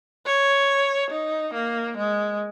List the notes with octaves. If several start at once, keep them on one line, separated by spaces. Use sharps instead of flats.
C#5
D#4
A#3
G#3